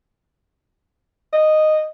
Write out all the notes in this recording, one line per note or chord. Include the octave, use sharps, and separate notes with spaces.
D#5